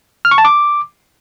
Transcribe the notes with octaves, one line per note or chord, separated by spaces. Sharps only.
F6
C#6
A5
D6